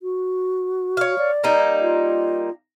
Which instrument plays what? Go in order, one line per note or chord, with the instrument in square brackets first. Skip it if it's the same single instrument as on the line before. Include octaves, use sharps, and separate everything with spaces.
[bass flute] F#4
[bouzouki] C#5 F5
[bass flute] D5
[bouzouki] G3 A#3 D#4
[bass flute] F4